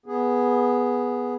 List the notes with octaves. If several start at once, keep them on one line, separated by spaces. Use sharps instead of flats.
B3 G#4